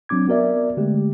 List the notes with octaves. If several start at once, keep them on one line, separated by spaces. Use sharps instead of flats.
F#3 C4 D4 D6 G#6
B3 F#4 A#4 D5 E5
D3 G#3 A3 G4